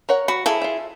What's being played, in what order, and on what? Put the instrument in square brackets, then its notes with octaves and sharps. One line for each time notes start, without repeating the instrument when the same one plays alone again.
[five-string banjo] A#4 C#5 F#5
[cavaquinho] F#4 [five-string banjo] B5
[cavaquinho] E4 G#4 [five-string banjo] A4 F5
[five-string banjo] F4 E5